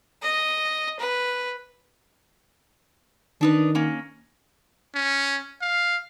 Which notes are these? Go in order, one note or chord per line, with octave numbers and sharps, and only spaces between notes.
D#5
B4
D#3 D4 D#4 B4
A#3 C#4
C#4
F5